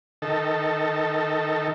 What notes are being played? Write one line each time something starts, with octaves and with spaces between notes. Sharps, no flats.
D#3 A4